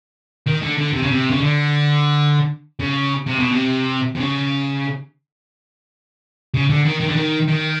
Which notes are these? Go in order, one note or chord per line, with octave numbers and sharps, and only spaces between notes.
D#3
D3
D3
C3
C#3
C3
C#3
D3
C#3
C3
B2
C3
C3
C#3
C#3
D3
D#3
D#3
D3
D#3
D#3